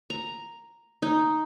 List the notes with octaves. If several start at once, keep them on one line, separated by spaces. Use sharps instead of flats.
A#5
D#4